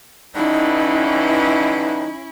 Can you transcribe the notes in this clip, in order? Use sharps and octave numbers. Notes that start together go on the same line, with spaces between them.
G2 D3 E3 C#4 D#4 E4